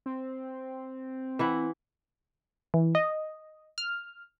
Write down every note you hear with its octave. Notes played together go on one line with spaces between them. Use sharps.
C4
E3 E4 F#5
E3
D#5
F6